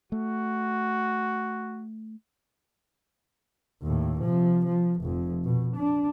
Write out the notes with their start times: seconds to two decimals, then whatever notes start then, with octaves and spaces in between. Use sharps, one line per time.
0.12 A3 F#4
3.82 D#2 A2
4.21 C3 F3
4.66 F3
5.01 F1 F2
5.44 B2
5.76 D4